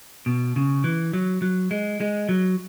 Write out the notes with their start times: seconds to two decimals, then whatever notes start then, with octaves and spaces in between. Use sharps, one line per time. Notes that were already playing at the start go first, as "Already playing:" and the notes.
0.26 B2
0.56 C#3
0.84 E3
1.13 F#3
1.42 F#3
1.71 G#3
2.01 G#3
2.29 F#3